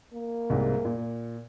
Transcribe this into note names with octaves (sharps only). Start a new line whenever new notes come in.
A#3
C2 G#2 C3
A#2